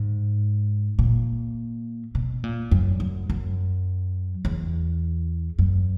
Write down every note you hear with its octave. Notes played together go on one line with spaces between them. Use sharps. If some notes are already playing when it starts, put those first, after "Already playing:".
Already playing: G#2
A#2
B2
A#2
F#2
F#2
F#2
E2
F#2